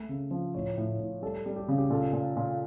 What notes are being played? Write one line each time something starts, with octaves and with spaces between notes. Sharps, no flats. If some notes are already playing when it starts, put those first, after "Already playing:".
Already playing: A3 E5
C#3
F3
A2 C#5
A2
A2
G3 A4
G3
G4
C#3
G4
A#2 A4
A#2
A#2